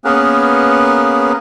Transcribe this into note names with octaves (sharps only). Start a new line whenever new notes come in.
A#3 B3 C#4 G#4 A#4 B4